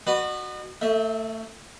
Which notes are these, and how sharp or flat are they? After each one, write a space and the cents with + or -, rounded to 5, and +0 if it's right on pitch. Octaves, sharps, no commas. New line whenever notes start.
F#4 +0 B4 +0 D#5 -40
A3 +25 E5 -25